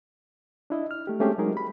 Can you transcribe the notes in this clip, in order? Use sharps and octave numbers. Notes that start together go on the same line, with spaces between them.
D4 E4 D#5
F6
A3 G4
G#3 A3 C4 C#4 G4 G#4
F#3 G#3 D#4 G#4 A#4
B5